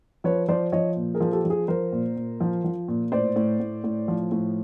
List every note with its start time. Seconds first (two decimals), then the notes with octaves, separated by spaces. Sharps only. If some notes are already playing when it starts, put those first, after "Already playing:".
0.24 F3 B4 C#5
0.48 F3 C5 D5
0.72 F3 C#5 D#5
0.97 A#2
1.14 G#4 A#4
1.21 F3
1.32 G4 A4
1.45 F3
1.50 G#4
1.68 F3 A#4 C5
1.92 A#2
2.16 A#2
2.40 F3
2.64 F3
2.88 A#2
3.12 A2 C5 D5
3.36 A2
3.60 A2
3.84 A2
4.08 F3
4.32 A2